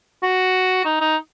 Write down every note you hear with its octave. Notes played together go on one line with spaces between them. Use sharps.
F#4
D#4
D#4